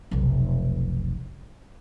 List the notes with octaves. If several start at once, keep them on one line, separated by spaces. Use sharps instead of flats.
F1 B1